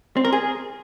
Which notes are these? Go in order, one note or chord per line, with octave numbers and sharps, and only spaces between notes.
C4
A#4
G#4